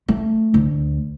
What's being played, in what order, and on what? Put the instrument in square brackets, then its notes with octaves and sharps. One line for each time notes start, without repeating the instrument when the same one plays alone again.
[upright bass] A3
D2